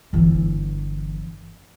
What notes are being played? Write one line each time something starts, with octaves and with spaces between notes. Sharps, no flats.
G1 E3